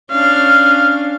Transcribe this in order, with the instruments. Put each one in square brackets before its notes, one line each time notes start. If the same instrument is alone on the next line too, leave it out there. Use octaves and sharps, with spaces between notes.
[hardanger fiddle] C#4 D4 [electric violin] F5